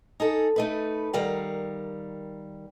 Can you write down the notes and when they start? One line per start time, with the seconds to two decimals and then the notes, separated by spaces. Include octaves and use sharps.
0.20 D#4 G#4 A4
0.56 A3 D#4 B4
1.13 D#3 G3 A#4 F5 F#5